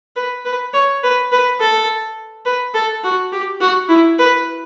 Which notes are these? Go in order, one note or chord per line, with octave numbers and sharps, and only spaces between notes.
B4
B4
C#5
B4
B4
A4
B4
A4
F#4
G4
F#4
E4
B4